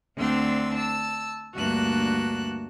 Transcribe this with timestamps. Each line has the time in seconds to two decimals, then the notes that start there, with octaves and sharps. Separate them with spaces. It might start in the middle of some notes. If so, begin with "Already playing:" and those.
0.17 D2 C4 D4 C6 E6
0.76 A5 E6
1.56 D2 G2 A#3 F#4 A5 F#6